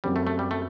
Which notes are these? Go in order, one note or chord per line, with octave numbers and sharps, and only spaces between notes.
F#2 F#3 G3 C4 G4
A3
A3
G3
A3